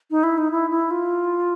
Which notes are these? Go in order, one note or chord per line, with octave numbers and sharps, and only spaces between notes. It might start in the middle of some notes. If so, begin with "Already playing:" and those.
D#4
E4
D#4
E4
E4
F4